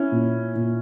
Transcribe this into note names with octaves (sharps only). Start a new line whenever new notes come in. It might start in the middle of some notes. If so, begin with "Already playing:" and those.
Already playing: C#4 E4
A#2
A#2